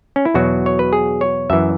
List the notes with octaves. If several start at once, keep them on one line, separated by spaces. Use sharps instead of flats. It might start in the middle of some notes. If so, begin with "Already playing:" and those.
C#4
E4
E2 B2 F#3 F#4
C#5
B4
G#4
C#5
F#2 E3 E5